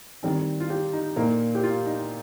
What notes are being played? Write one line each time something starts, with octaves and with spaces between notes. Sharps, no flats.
D#3 G3 C4
F4
G4
D#4
A#2 A#3 D#4
G4
F4
D#4